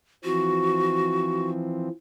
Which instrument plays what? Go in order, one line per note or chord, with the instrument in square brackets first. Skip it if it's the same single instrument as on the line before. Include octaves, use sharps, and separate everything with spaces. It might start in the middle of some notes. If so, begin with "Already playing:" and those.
[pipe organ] E3 F3 C4 [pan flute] F#4